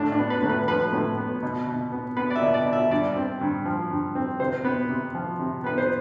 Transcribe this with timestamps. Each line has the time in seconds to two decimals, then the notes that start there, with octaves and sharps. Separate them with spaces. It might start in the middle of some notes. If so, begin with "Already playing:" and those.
Already playing: A2 D4
0.12 D4
0.19 B3
0.30 B4
0.43 A2
0.49 B4
0.68 F3 B4
0.93 A2
1.18 B3
1.43 B2
1.67 B2
1.92 B3
2.17 B3 B4
2.30 D5
2.36 E5
2.42 B2
2.54 D5
2.66 B2
2.73 E5
2.91 G2 D5
3.16 C4
3.41 G2
3.66 F3
3.91 G2
4.15 C4
4.40 C3 C5
4.65 B3
4.89 C3
5.15 F3
5.39 C3
5.64 B3 B4
5.78 C5